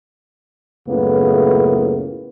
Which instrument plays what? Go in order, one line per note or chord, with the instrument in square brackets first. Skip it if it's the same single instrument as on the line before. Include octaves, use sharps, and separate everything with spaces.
[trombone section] C#2 F#2 A2 C#3 A#3 B3